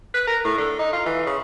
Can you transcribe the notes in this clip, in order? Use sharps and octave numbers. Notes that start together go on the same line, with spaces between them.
B4
A#4
A2
D3
D#4
F4
E3
C#3